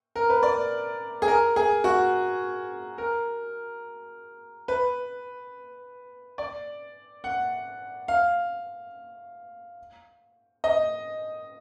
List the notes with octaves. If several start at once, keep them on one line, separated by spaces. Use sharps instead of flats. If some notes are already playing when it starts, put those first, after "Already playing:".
A#4
B4
D5
G#4
A#4
G#4
F#4
A#4
B4
D5
F#5
F5
D#5